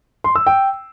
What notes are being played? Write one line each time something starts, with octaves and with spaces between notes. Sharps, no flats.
C6
E6
G5